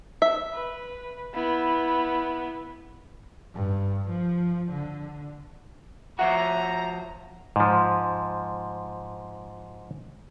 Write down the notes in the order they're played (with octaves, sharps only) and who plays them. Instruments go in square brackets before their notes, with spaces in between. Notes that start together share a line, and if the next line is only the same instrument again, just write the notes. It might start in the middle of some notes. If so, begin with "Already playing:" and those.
[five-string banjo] E5
[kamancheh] B4
B3 E4
[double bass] G2
F3
D3
[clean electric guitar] F3 F#4 [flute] E5 [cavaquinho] F#5 D6 [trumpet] A#5
[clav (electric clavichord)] G#2 F3